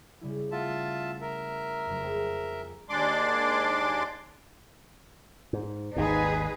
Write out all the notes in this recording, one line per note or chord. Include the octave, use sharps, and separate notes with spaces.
C#3 G3 E4
A3 F4 E5 F#5 A5
A#4 E5
F#1 F2
G#4 C5 G5
D#2 G#3 D4 D5 C6 D6
G#2
G#1 D#2 G#2 D#4 G#4 B4